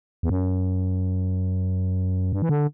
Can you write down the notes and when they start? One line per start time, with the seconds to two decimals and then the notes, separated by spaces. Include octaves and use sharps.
0.23 E2
0.30 F#2
2.33 G2
2.42 E3
2.49 D3